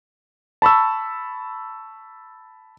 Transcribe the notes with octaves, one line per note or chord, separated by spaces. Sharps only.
A5 B5 C#6 E6